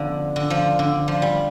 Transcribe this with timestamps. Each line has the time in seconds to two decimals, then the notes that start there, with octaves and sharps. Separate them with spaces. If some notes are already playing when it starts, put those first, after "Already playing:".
Already playing: D3 F3 B3
0.36 D3
0.50 F3
0.79 D3
1.08 F3
1.22 G3